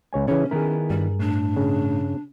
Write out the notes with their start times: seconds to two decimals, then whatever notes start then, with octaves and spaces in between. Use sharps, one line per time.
0.13 C#2 C#5 G#5
0.28 C#3 E3 C#4 C#5
0.51 D#3 B3 E4 G#4 A#4
0.90 G2 G3
1.19 A2 D4
1.56 C#3